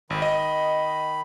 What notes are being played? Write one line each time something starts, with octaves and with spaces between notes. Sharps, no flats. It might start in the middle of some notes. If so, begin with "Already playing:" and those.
G#1 D#3 B5
D#5